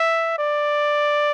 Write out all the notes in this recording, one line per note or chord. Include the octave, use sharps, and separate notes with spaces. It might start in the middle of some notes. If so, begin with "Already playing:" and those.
Already playing: E5
D5